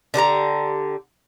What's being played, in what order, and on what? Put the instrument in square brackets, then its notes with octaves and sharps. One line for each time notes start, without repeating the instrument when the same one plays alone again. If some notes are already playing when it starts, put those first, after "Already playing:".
[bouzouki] D3 G4 B4 A#5